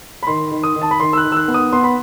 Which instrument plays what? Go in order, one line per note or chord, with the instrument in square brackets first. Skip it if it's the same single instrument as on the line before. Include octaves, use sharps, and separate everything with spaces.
[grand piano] B5
D#3 C6
D#3
D#6
D#3
A5
B5
D#3 C6
E6
F#6
D#3
E6
F#6
B3
D#6
B3 C6
B5